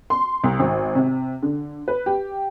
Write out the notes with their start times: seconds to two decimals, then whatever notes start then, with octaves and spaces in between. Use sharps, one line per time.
0.10 C6
0.44 C2
0.60 G#1
0.95 C3
1.43 D3
1.88 B4
2.06 G4